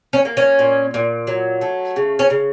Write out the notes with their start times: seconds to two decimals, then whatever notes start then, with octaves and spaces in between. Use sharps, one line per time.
0.13 C#4
0.25 A#3
0.37 C#4
0.59 A#2
0.94 A#2
1.27 F#3
1.61 A3
1.96 C#3
2.19 C#4
2.30 C#3